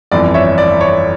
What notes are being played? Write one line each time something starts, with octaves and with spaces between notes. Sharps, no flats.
G1 F2 E3 D5
C#5 E5
D5
C#5